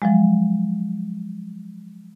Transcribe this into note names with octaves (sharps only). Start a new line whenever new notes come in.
F3 F#3 G#3